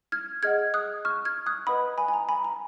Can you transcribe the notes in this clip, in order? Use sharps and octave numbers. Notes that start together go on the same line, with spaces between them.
F6 G#6
G#4 D#5 F#5 F6 G#6
D#6 F#6
C#6 F6
F6 G#6
D#6 F#6
B4 D#5 F#5 B5 D#6
G#5 B5
G#5
A#5
G#5 B5
A#5